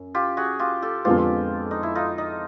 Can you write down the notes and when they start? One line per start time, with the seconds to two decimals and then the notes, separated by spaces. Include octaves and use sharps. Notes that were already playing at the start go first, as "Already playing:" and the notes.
Already playing: F#2
0.14 F4 G4
0.37 F#4 G#4
0.59 F4 G4
0.82 G4 A4
1.05 F2 D3 F3 G#3 B3 F4 G4
1.71 D#4
1.83 E4
1.95 D#4 F4
2.18 D#4